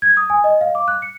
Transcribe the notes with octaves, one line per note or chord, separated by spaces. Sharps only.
G#6
D#6
G#5
D#5
F5
D6
F#6
C#7